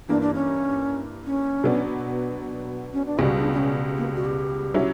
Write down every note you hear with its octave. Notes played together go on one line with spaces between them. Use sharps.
G2 E3 A#3 D4
D4
C#4
C#4
B2 F#3 B3 D4
C#4
D4
C#2 B2 G3 F#4
D4
D4
C#4
A#3
F#4
G4
F#3 C#4 E4